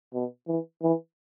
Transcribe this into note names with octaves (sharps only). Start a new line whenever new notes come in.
B2
E3
E3